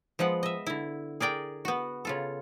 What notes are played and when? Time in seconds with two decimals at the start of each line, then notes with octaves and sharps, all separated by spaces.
0.19 F3 G#3 B3 F#5
0.43 D#5 E5
0.67 D3 E4
1.20 G#4 A#4 D5 G5
1.65 B3 F#4
2.05 C#3 F4 A4